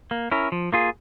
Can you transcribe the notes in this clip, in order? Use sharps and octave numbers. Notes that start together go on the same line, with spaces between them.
A#3
C#4 E4 A#4
F3
A#3 F4 G#4